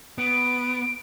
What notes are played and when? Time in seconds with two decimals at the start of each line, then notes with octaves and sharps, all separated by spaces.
0.18 B3 D7